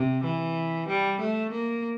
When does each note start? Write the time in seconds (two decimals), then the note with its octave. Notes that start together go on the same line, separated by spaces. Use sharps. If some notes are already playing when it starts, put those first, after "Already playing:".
Already playing: C3
0.24 E3
0.89 G3
1.20 A3
1.52 A#3